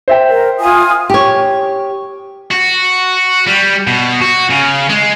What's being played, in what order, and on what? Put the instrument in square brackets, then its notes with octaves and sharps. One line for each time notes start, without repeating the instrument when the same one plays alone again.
[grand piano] C5 E5 G5
[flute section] A#4
F4 G#5 D#6
[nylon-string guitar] G4 C#5
[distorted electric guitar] F#4
G3
B2
F#4
C#3
G#3